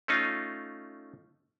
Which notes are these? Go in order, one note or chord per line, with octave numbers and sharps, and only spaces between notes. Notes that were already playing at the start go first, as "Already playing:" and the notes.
A3 C#4 D#4 F4